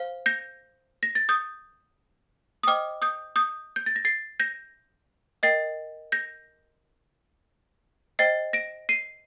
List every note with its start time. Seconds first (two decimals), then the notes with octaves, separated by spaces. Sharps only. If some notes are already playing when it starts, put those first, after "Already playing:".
Already playing: C5 F5
0.26 G6 A#6
1.03 A#6
1.15 A6
1.29 D#6 G6
2.63 D#6
2.67 C5 D#5 G5 D6 F6
3.02 D#6 G6
3.36 D#6 G6
3.76 G6
3.86 A6
3.96 A#6
4.05 A6 C7
4.40 G6 A#6
5.43 A#4 D#5 G5 A6 C7
6.12 G6 A#6
8.19 C5 D#5 G5 A6 C7
8.53 A#6 D7
8.89 C7 D#7